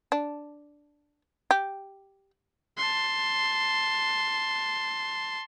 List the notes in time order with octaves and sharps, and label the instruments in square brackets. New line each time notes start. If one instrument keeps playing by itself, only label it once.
[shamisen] D4
G4
[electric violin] A5 C6